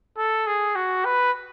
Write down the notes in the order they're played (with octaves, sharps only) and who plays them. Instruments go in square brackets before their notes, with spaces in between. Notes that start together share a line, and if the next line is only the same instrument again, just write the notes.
[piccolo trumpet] A4
G#4
F#4
B4